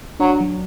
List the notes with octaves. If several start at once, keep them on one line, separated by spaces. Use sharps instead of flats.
F#3 D4
F#3